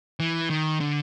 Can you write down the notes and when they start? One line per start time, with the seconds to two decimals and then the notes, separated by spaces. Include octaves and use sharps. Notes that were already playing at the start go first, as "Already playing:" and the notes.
0.20 E3
0.50 D#3
0.80 D3